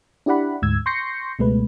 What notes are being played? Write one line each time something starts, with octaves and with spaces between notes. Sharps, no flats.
D4 E4 G4 D5 F#5 B5
D2 G#2 E6 G#6
C6 C#6 G6 A#6 C7 C#7
C#2 B2 G#3 A3 B4